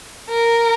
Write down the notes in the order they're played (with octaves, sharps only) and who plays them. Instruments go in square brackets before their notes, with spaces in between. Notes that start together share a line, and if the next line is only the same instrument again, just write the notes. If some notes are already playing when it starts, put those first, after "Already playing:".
[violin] A#4